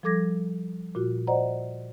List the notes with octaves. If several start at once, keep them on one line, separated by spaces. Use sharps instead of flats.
F3 G3 A4 D6 G#6 A#6
A#2 F4 F#4
C5 D5 D#5 F#5 A#5